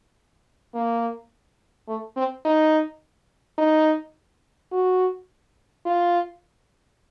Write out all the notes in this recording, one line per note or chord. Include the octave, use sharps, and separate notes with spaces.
A#3
A3
C4
D#4
D#4
F#4
F4